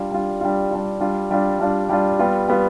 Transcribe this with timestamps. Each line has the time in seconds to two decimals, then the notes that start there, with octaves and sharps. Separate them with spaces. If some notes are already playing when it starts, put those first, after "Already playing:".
Already playing: G3 D4 F4
0.11 G3 D4 F4
0.41 G3 D4 F4
0.71 G3 D4 F4
1.00 G3 D4 F4
1.31 G3 D4 F4
1.60 G3 D4 F4
1.89 G3 D4 F4
2.19 G3 B3 F4
2.48 G3 B3 F4